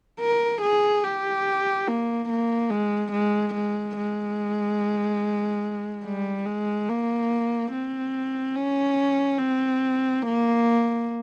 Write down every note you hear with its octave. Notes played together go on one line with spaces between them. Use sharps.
A#4
G#4
G4
A#3
A#3
G#3
G#3
G#3
G#3
G3
G#3
A#3
C4
C#4
C4
A#3